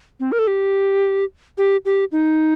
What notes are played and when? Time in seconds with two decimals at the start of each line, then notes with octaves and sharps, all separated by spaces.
0.20 C4
0.32 A#4
0.39 A4
0.47 G4
1.58 G4
1.85 G4
2.12 D#4